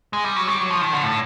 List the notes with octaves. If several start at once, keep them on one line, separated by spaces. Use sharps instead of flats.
G#3
G3
F#3
G3
F#3
F3
D#3
D3
A2